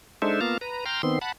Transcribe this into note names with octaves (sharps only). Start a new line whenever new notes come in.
G#3 D4 D#4 A4 C5 E5
A#3 B3 F4 F5 A5 A#5
B4 A#5
G5 A#5 C6 F6
D#3 B3 C4 C6
F#5 A5 B5